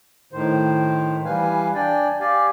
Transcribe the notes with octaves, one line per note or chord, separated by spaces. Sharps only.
A2 D#3 C5
E3 G3 B4 F5 G#5
D4 D5 G5 G#5
G4 D5 F5 G#5